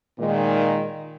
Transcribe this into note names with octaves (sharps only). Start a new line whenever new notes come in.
A#2 D#3 G#3